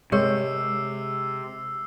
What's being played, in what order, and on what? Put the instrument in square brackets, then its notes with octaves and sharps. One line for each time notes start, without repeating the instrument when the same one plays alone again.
[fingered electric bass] C3 [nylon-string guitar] G#3 [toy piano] G4 A#4 C#5 [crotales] D6 E6 C7